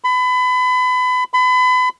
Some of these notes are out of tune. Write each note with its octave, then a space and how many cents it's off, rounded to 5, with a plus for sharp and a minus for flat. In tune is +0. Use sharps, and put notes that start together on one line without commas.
B5 +30
B5 +35